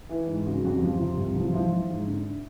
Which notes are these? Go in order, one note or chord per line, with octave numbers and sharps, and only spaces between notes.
E3
G#2
C#3 F#4
F2 F#4
G4
F3
C3 F4
C2
F3
F4
F3 E4
F3
G#2
D3